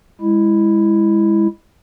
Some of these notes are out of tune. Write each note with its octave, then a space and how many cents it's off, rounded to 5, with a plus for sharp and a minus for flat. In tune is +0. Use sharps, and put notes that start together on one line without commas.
G#3 -20 E4 +0